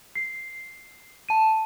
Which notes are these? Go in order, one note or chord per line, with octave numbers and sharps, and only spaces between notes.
C7
A5 D#7